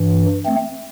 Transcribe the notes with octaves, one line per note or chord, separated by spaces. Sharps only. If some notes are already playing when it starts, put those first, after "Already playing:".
Already playing: G2 E3
A3 C4